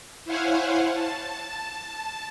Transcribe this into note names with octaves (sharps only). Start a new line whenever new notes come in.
E4 C5 C#5 F5 F#5 G#5
A5